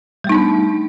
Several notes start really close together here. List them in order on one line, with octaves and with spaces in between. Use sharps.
G3 A3 D#4 B3 D4